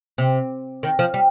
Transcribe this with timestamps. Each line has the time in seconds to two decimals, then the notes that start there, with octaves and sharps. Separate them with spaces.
0.18 C3
0.83 D#3
0.99 F3
1.14 G3